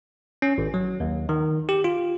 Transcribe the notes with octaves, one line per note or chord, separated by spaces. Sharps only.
C#4
G#1
F#3
D#2
D#3
G4
F4